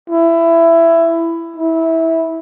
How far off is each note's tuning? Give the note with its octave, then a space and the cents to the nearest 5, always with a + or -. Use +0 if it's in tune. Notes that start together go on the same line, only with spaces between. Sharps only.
E4 +15
E4 -15